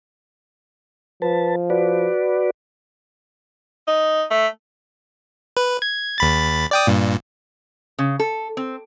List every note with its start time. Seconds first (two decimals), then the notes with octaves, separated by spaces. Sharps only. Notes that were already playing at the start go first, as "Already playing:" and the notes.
1.22 F3 B4 A5
1.70 F#4 B4 D5
3.87 D#4
4.31 A3
5.57 B4
5.82 G#6
6.18 D#2 B5 A6
6.71 D5 G5 D#6
6.87 G2 A#2
7.99 C#3
8.20 A4
8.57 C4